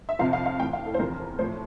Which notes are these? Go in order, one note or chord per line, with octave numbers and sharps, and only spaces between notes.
E5
F2 C3 F3 F5
F5
F5
A2 E3 G5
F5
A4
C5
E2 C3 F3 A#4
A2 F3 C5